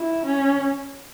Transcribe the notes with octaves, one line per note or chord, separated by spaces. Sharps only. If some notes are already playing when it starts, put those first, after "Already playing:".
Already playing: E4
C#4